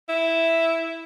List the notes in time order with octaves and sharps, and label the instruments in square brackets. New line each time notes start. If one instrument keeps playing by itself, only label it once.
[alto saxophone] E4